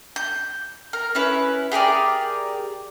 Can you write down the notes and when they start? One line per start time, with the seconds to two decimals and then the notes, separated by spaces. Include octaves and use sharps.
0.16 G6
0.93 A#4
1.15 C#4 E4 B4
1.72 G4 G#4 A#4 D5